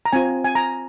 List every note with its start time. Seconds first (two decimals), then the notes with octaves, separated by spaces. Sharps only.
0.05 A#5
0.13 C4 F4 G#5
0.45 G#5
0.55 A#5